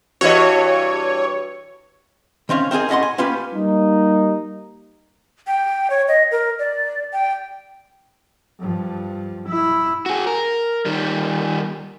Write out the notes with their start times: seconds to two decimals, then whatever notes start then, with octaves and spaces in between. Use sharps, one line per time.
0.21 G2 E3 F#4 C#5 D#5
2.49 D#3 C4 C#4 F5
2.71 C4 D#4 F4 G#4 A#4
2.89 A2 C#4 D#5 F#5 C6
3.03 G#5
3.18 A#3 C#4 F4 G4 B4
3.53 G3 A#3 D#4
5.47 G5
5.90 C#5
6.08 D#5
6.31 A#4
6.59 D5
7.13 G5
8.60 G2 F3
9.49 E4
10.06 F#4 G#4
10.27 A#4
10.86 D#3 G3